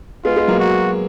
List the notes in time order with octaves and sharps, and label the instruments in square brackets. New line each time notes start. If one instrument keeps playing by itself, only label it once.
[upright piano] G#3 B3 [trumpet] F4
[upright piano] G#3 B3
F#3 A#3
[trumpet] F#4